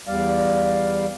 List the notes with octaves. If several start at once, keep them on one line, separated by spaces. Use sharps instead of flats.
E2 G3 D5 F5